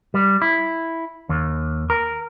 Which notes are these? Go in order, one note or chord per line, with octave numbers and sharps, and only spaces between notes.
G3
E4
D#2
A#4